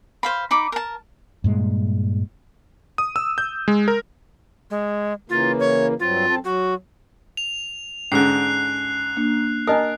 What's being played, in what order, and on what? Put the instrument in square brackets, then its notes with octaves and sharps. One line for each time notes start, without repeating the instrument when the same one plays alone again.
[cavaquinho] C5 F5 B5
D#4 B5 D6
A#4 A5
[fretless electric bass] G2 A#2 G#3
[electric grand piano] D#6
E6
G6
G#3
A#4
[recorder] G#3
[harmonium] C#3 E3 A#3 [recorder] F4
[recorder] C#5
[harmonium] G2 F#3 C4 [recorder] F4
[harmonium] F#2 C4 A4
[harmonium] F#3 [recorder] F#4
[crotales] F7
[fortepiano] G#2 D3 [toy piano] C#4 [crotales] F#6 C7
[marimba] A#3 D4
[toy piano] D4 D#5 D#6 [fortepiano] A#4 [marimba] A5 A#5